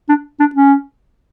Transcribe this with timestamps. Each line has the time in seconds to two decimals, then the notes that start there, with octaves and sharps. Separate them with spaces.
0.09 D4
0.40 D4
0.55 C#4